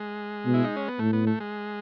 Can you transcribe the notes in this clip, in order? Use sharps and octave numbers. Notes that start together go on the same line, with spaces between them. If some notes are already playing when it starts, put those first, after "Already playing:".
Already playing: G#3
B2
E4
D#4
C#4
B3
A2 A3
B3
A3
G#3